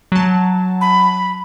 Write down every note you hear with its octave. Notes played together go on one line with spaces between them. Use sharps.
F#3 A5
B5